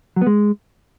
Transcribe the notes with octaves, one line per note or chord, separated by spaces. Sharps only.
F#3
B3
G#3